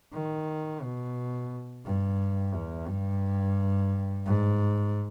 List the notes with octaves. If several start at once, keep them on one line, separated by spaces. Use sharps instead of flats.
D#3
B2
G2
E2
G2
G#2